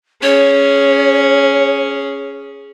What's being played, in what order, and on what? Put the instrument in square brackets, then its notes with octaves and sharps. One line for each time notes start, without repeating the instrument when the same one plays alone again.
[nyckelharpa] C#4 G#4 [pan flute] C#5